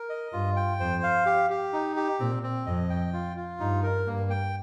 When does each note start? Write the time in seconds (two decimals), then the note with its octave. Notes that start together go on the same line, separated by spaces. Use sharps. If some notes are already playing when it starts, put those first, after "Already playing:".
Already playing: A#4
0.09 D#5
0.33 G2 F4
0.56 G5
0.80 F2 C5
1.03 F5
1.26 G4
1.50 G4
1.73 D#4
1.96 G4
2.20 A#2 C4
2.43 C4
2.66 F2 D#5
2.90 G5
3.13 F4
3.36 F4
3.60 G2 D#4
3.83 A#4
4.06 G2 A#3
4.30 G5